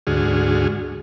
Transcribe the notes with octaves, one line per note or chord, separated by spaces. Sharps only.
D2 G#2 D3 F#4 G#4 F6